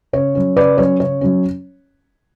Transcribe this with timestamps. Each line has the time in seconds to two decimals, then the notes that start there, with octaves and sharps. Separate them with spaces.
0.13 C#3 C#5
0.35 F#3 C#4
0.56 C#3 B4 D5
0.78 F#3 C#4 C#5
1.00 C#3 C#5
1.21 F#3 C#4